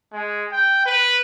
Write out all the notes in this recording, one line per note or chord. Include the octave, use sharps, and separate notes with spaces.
G#3
G5
B4